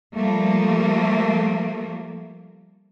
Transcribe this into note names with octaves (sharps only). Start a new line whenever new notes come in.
F3 G3 A3 A#3